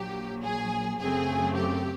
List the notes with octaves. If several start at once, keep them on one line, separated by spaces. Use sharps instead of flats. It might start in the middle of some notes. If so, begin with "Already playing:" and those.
Already playing: A#1 A#2 F#3 G4
G#4
F#2 C#3 F#3 A3 C4 G#4
G4